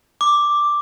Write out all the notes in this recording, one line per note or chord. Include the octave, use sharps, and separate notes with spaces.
D6